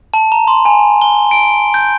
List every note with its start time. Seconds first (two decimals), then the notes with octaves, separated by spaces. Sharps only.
0.14 A5
0.32 A#5
0.47 C6
0.65 G#5
1.01 G7
1.31 D7
1.74 G6